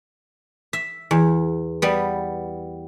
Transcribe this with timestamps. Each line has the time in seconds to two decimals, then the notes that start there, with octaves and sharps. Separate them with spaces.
0.73 E5
1.11 E2
1.82 G3 B3